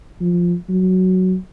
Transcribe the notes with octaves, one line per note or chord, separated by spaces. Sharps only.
F3
F#3